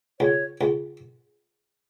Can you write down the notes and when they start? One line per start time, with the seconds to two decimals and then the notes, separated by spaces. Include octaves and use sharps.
0.20 C#2 C#5
0.61 C#2